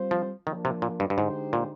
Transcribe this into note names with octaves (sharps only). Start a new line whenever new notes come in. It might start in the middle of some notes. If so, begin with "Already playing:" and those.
Already playing: G3 C4 F4 C5
F3
D#3 F3 A#3 D4
C3
A#2
G2
G2
G#2 D3 G#3 D#4 G4 C5
A#2